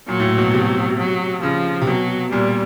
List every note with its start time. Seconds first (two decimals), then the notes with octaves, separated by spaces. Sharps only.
0.08 A#2 F#3
0.20 A2
0.24 A#2
0.38 B2
0.54 C3
0.98 F#3
1.43 C#3 F3
1.81 C3
1.87 B2 F#3
2.32 A#2 G3